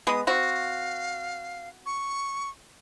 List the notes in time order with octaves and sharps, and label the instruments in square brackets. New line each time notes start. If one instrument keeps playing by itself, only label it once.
[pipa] G#3 B3 [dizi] D#6
[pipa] C4 F#4 [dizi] F5
[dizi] C#6